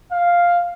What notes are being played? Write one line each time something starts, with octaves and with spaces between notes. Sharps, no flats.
F5